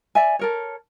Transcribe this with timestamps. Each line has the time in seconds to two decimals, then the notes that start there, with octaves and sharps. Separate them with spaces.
0.15 D5 E5 G#5
0.39 A4 A#4 C#5